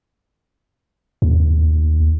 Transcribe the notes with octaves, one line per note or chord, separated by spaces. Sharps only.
D#2